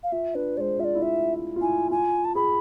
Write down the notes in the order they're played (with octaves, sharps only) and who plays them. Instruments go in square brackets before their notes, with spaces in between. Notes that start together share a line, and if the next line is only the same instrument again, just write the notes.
[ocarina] F5
[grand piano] F4 [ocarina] E5
[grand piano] D4 [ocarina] B4
[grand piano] G#3 [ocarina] C5 D5
[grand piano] F4 [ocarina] E5
[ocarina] D5
[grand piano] E4
[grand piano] F4 [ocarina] E5
[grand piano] F4
[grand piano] E4 [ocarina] G#5
[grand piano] F4 [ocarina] G#5
[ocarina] A5
[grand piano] G#4 [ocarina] B5